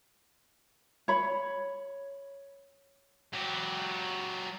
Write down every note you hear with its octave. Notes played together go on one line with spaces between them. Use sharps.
C#5 B5
F#3 G4